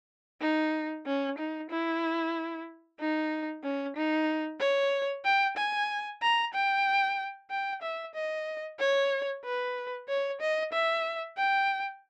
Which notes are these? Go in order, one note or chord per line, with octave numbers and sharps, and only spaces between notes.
D#4
C#4
D#4
E4
D#4
C#4
D#4
C#5
G5
G#5
A#5
G5
G5
E5
D#5
C#5
B4
C#5
D#5
E5
G5